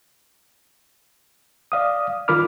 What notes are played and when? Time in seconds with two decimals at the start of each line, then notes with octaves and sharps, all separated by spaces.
1.72 D5 F5 D#6
2.28 D#3 F4 A#4 B5 D6 F6